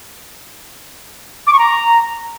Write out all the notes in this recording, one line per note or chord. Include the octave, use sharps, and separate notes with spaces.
D6
C#6
A#5